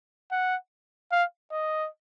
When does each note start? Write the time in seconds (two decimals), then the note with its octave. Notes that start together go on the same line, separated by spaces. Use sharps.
0.32 F#5
1.12 F5
1.52 D#5